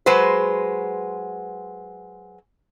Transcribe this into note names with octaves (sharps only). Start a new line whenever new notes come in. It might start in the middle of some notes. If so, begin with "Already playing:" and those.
F#3 G#3 B4 C5